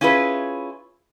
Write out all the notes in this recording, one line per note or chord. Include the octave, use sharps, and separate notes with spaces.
C#4 E4 F4 G#4 B4